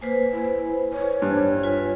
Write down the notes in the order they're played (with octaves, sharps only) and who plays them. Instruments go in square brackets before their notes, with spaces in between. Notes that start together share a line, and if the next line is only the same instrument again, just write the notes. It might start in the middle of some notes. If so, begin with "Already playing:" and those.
[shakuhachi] A#3 [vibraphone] B4 C5 G#5
[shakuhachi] E4
C#5
[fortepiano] G2
[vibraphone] F4 B4 G#5